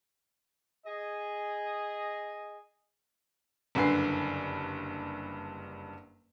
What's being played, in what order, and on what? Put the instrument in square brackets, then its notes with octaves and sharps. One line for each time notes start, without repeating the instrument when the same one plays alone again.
[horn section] G#4 D#5
[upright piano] F#1 G2 D3 B4 G#5 C7